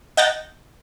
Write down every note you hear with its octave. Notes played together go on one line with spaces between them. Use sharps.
D#5 F#5 G5 A5 A#5